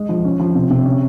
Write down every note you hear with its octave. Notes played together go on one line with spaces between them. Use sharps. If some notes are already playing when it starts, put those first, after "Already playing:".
Already playing: G#3
F3
C#4
F3
C3
C3
C#4